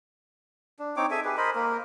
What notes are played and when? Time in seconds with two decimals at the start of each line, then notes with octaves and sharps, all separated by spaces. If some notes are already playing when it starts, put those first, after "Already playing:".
0.79 D4
0.97 C4 D#4 C#5 D6
1.11 G#4 A4 E5 G#5
1.25 G4 G#4 B4
1.37 A#4 C5 D#5 B5
1.55 A#3 A#4